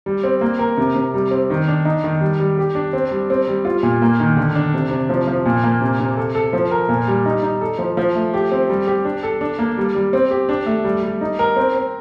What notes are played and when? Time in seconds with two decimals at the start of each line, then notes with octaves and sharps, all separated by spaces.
0.06 G3
0.23 C4
0.41 A#3
0.59 A#4
0.77 C3
0.95 C3
1.14 G3
1.31 C4
1.50 D#3
1.68 D4
1.85 D#4
2.04 D#3
2.21 G3
2.40 G3
2.58 G4
2.75 D4
2.93 C4
3.11 G3
3.30 C4
3.48 G3
3.65 F4
3.83 A#2
4.02 A#3
4.20 D#3
4.37 D3
4.55 D4
4.74 C3
4.91 C3
5.09 F3
5.27 F3
5.45 A#2
5.63 A#3
5.81 C3
6.00 C3
6.17 A4
6.35 A4
6.53 F3
6.71 A#4
6.89 A#2
7.08 G3
7.26 D#4
7.42 D#4
7.61 A4
7.78 F3
7.97 F3
8.15 A3
8.34 G4
8.51 C4
8.70 G3
8.87 G4
9.05 D4
9.23 A4
9.41 D4
9.59 A#3
9.78 G3
9.95 G3
10.13 C4
10.31 G4
10.49 D4
10.66 A3
10.84 G3
11.02 G3
11.21 D#4
11.39 A#4
11.56 C4
11.74 C4